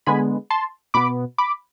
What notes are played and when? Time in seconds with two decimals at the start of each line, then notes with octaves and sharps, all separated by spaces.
0.06 D3 G#3 B3 G#5 B5
0.50 A5 C6
0.94 B2 B3 B5 D6
1.38 B5 D6